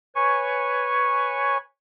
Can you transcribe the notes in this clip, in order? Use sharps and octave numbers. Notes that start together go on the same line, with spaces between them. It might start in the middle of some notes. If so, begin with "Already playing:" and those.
B4 C#5 G#5 C#6